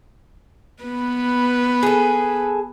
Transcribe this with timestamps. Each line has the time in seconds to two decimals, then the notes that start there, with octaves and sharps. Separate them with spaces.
0.84 B3 B4
1.83 G#4 A4